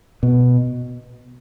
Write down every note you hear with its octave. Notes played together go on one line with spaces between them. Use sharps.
B2